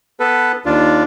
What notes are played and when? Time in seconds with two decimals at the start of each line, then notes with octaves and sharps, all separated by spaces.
0.20 B3 A4 B4
0.66 D#2 D4 F4